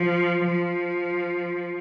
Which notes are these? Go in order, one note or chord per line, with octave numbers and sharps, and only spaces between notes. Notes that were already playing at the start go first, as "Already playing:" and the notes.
Already playing: F3
F3